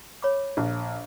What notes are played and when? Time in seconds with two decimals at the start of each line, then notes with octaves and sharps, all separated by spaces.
0.22 C#5 B5 D6
0.57 A#1